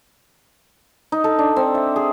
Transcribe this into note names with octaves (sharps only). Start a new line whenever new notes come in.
D#4
A4
D4
C4
E5
G#4